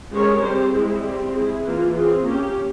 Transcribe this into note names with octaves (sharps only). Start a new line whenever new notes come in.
G#3 C#4 G4 A#4 C#5
G3 C4 G4 C5
G#3 C4 E4 G#4
G3 C4 G4
G#3 E4 G#4
E3 A#3 F4
C4 F4 G#4
A#3 C#4 G4